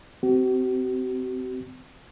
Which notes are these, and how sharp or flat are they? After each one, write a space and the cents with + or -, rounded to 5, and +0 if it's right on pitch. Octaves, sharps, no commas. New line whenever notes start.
C4 -20 F#4 +45